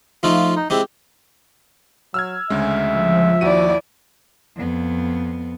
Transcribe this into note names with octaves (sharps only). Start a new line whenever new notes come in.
F3 A3 D#4 F4
D#4
G#3 C4 E4 G4
F#3 E6 F6 G#6
D2 C#3 G#3 E5
F3
D#2 E4 F#4 D5 D#7
F2 B3